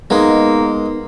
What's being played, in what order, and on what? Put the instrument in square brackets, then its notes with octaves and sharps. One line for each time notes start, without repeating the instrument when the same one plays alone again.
[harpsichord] G#3 [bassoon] A#3 [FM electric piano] B3 D#4